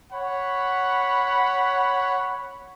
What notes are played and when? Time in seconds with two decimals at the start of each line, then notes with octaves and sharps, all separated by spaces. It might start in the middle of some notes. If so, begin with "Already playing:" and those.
0.12 C#5 F#5 B5